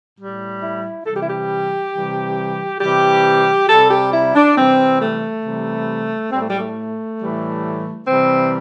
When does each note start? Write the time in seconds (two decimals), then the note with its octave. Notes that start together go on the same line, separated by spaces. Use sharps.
0.18 A2 G3
0.62 E4
1.06 C3 E3 G3 A4
1.14 G4
1.21 E4
1.29 G4
1.93 C3 E3 G3
2.81 C3 E3 G3 G4
3.69 C3 G3 A4
3.91 G4
4.13 E4
4.35 D4
4.56 C3 E3 G3 C4
5.00 A3
5.44 C3 E3 G3
6.32 A2 G3 C4
6.41 A3
6.50 G3
6.59 A3
7.20 A2 E3 G3
8.07 C3 E3 G3 C4